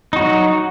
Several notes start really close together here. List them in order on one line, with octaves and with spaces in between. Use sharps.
D#4 F#4 F#3